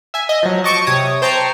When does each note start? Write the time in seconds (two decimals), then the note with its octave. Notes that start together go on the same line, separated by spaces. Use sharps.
0.14 E5 G#5
0.29 D#5
0.43 F3 F#3
0.64 D#5 A5 C#6 D6 G6
0.87 C3 C#5 D#6
1.22 C5 G5 A5 A#5 C#6 C7